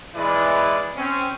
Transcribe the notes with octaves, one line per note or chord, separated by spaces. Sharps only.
E3 G#3 E4 B4 D5
C4 C#4